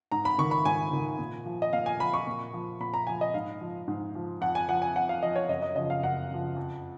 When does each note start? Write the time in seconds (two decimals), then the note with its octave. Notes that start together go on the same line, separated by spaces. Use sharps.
0.12 G#2 A#5
0.25 B5
0.38 D#3 C#6
0.51 B5
0.65 G#2 G#5
0.93 D#3
1.19 A#2
1.46 F3
1.62 D#5
1.73 A#2 F5
1.86 G#5
1.99 F3 B5
2.14 C#6
2.27 A#2
2.53 F3
2.80 A#2 B5
2.94 A#5
3.07 F3 G#5
3.21 D#5
3.34 G#2 F5
3.61 F3
3.88 G#2
4.15 F3
4.41 F2 F#5
4.55 G#5
4.69 F3 F#5
4.82 G#5
4.96 F2 F#5
5.09 F5
5.23 F3 D#5
5.36 C#5
5.49 F#2 D#5
5.62 D#5
5.76 C#3 F3 D#5
5.90 F5
6.03 F#2 F#5
6.31 C#3 F3
6.56 F2